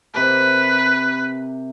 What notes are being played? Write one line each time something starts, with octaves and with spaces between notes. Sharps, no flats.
C3 G4 A#4 B4